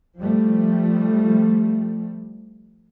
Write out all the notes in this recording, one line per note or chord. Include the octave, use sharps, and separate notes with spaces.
F3 G3 A3